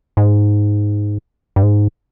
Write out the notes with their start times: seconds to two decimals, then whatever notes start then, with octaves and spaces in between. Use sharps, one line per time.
0.17 G#2
1.56 G2
1.63 G#2